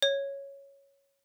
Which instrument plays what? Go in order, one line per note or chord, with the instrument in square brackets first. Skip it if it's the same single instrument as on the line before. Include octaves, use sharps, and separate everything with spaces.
[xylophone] C#5